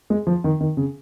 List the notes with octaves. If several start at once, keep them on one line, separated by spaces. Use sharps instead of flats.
G#3
F3
D#3
D#3
C#3